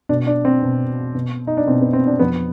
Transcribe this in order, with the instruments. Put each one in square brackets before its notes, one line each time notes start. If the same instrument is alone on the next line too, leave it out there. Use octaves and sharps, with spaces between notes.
[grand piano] B2 D4
D4
C4
B2
B2
D#4
D4
B2 C4
B3
C4
D4
F2 B3